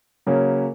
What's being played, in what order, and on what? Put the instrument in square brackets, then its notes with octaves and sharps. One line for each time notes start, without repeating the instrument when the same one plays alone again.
[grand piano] C#3 F#3 A#3 C#4